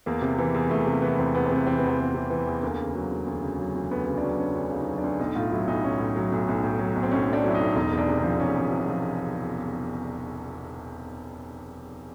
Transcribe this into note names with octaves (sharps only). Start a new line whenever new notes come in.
E2 A#3
C3
E3
E2
E2 A3
C3 A#3
E3 B3
E2 C4
E2 B3
C4
C3 B3
E3 C4
B3
E2
C4
E2 B3
C3
E3
E2
D2 A#3
C#3
F#3
D2
D2
C#3
F#3
D2
D2 B3
C#3 B3
D4
F#3 C#4
D2 C#4
D2 D4
C#3 D#4
F#3
D4
D2
B1 D#4
A2 F4
F#3 E4
B1 D#4
B1 C#4
A2
F#3
B1
B1
A2
F#3
B1
C4
B1 C#4
A2 D4
F#3 E4
D#4
B1
E1 D#4
E2
D4
C3
F3 D4
E1 C#4
E2
C3
F3